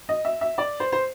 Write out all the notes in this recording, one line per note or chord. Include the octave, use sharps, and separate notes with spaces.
D#5
E5
E5
D5
C5
C5